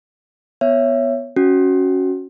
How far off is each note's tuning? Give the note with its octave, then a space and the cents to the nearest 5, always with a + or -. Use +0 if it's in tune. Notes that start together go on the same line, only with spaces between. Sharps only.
B3 +0 C#5 +0 E5 +20
C#4 +0 F#4 +0